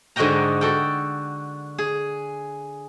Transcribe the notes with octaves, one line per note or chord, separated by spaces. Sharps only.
G#2 D3 F#4 D#5 G5 A#5
F#4 A4 G5
G#4